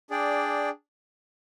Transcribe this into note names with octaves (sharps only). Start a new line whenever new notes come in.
D4 G#4 D5 G5